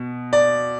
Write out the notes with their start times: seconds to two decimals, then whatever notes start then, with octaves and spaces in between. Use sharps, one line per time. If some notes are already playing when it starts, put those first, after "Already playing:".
Already playing: B2
0.33 D5